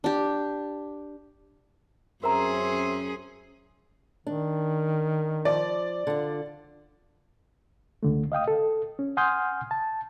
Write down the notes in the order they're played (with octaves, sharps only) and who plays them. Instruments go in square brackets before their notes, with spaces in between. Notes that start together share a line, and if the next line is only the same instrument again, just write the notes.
[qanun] D4 G4
[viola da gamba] F#2 C#4 G#4 [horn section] C4 E5 C6 [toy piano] A#4 A#5
[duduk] D#3 [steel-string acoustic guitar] D4
[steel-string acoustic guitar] F3 [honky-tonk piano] D5
[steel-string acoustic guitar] D3 F4
[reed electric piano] C#2 D3 A3
D#5 F5 G5 D#6
A4
C#4
F#5 G#5 C6 D#6 F6 G6
A5